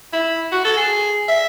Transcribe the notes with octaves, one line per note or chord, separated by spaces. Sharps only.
E4
F#4
A4
G#4
E5